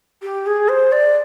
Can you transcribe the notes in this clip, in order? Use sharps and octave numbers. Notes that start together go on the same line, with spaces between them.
G4
G#4
C5
D5